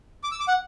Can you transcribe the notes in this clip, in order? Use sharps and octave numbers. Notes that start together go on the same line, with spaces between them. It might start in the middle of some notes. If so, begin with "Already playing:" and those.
D6
E6
D6
F#5